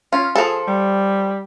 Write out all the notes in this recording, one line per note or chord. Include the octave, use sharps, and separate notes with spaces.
C#4 F4
F3 G#4 A4
G3